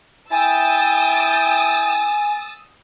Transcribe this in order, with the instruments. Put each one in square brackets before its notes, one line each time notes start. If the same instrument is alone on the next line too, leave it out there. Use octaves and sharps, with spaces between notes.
[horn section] E4 E5 G5 [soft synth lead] G#5 [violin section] D#6 E6 A6